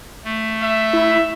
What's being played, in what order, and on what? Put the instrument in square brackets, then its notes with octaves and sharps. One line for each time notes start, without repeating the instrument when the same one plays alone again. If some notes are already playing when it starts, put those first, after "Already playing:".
[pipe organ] A3
[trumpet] E5
[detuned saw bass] E4